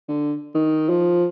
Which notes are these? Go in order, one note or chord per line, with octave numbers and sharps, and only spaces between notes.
D3
D#3
F3